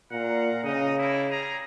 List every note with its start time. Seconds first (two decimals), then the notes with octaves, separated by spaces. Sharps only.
0.12 A#2 F5 F#5 A#5
0.65 C#3 D#4 D#5
0.98 A3 A#3 E4
1.30 G3 G#4 A#5